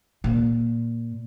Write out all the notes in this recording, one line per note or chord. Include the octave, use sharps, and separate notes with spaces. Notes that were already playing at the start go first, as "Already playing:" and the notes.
A#2